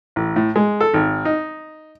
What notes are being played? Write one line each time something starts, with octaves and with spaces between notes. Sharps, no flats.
A1
A2
G#3
A4
G#1
D#4